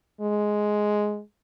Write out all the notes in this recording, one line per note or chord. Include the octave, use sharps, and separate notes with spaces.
G#3